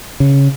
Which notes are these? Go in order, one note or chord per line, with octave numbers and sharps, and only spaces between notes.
C#3